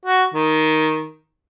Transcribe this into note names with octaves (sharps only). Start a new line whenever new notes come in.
F#4
D#3